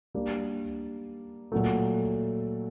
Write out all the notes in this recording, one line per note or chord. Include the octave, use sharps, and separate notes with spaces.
G3 A#3 D4
A#2 F#3 A3